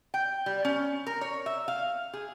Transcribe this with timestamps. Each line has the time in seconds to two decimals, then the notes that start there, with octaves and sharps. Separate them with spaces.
0.14 G5
0.46 G3
0.65 C#4
1.07 A#4
1.21 C#5
1.46 E5
1.68 F5
2.13 G#4